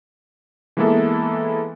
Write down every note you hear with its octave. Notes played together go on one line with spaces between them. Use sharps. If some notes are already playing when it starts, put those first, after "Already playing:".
E3 G#3 A#3 B3 E4 A4